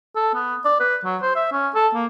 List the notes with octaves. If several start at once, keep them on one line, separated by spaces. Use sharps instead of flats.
A4
B3
D5
B4
F#3
C5
E5
C#4
A4
A#3